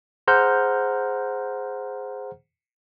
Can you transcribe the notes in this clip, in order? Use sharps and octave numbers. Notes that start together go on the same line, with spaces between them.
G#4 C5 F#5 A#5 F6 G6